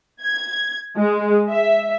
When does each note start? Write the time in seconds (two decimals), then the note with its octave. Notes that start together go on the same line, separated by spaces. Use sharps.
0.22 G#6
0.97 G#3
1.49 E5